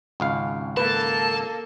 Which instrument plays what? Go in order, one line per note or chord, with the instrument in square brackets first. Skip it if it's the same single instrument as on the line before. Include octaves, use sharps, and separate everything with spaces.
[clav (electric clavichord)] G#1 C#2 F5
[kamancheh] A#3 A4 [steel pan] B4 [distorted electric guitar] A5